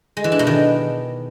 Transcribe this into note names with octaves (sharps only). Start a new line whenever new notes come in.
G#3
E3
D4
B2
D#3